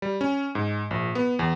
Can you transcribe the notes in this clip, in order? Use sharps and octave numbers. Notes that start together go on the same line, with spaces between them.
G3
C#4
G#2
A#1
B3
E2